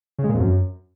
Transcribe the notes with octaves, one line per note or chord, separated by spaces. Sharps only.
C#3
G#3
A#2
F2
F#2